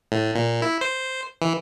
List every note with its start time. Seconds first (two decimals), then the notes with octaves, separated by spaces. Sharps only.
0.12 A2
0.35 A#2
0.62 E4
0.81 C5
1.42 E3